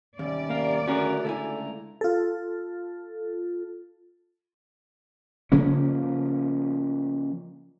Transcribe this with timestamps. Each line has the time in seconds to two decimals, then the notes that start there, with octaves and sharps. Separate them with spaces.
0.19 D#2 C3 G3 C#4 D5
0.50 A#3 F5
0.88 D#2 D3 A3 C#4 F#4 G#4 A#4 A#5
1.25 C#2 E4 A4 G#5
2.01 F4 A4
5.52 C#3 F3 A#3 C#4